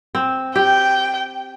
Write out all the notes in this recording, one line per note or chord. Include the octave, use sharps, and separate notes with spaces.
C4
G4 G5